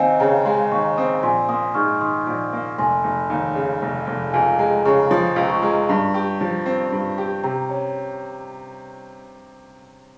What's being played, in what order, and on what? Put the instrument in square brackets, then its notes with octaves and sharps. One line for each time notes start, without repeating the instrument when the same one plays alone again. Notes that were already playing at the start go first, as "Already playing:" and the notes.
Already playing: [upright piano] D#2 C4 [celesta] D#5 F5 G5 G#5
[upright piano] C#3 [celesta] G5 A#5
[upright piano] G#3 [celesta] G#5 C6
[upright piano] D#2 [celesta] A#5 C#6
[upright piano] C4 [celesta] C6 D#6
[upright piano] A#1 [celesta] G#5 C6
[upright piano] A#3 [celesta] C6 D#6
[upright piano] G#2 [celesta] C#6 F6
[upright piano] D#3 [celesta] C6 D#6
[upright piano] A#1
A#3
[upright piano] F1 [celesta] G#5 C6
[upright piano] F1
D#2
C#3
F1
F1
[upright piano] C#2 [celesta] F5 G#5
[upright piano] G#3 [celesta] G5 A#5
[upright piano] C#3 [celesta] A#5 C#6
[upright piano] F3 [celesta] C6 D#6
[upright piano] C#2
[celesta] A#5 C#6
[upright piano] G#3
G2
G4
F3
C4
G2
G4
[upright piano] C3 [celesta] G5 A#5
[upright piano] C#4